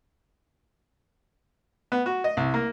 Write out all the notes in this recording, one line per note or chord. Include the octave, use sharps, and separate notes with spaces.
B3
F#4
D#5
C2
A#3